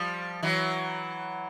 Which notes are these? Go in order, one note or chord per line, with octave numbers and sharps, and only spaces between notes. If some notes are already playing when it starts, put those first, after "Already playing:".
Already playing: F3 G3
E3 F#3